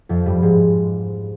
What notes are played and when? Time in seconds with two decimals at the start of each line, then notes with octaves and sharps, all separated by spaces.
0.09 F2 F3
0.26 G2 G3
0.42 G#2 G#3